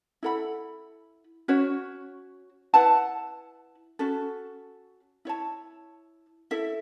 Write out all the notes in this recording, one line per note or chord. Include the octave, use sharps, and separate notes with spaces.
E4 A4 F#5 B5
C#4 F#4 C#5
E4 B4 F#5 A5
C#4 F#4 A4
E4 C#5 A5
E4 A4 E5